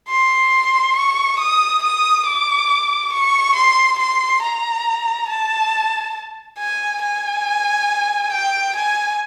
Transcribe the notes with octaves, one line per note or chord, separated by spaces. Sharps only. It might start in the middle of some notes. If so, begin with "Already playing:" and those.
C6
C#6
D#6
D#6
D6
C#6
C6
C6
A#5
A5
G#5
G#5
G5
G#5